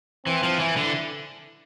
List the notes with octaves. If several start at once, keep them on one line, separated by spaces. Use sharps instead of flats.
E3 C4
F3
E3 E4
D3